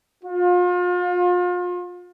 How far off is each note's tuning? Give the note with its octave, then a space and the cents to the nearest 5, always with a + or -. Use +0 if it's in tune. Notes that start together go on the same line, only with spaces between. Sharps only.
F4 +35